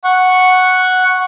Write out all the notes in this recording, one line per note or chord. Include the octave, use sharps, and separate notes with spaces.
F#5 C#6